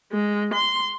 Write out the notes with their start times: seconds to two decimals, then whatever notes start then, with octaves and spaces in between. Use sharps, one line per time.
0.12 G#3
0.54 C6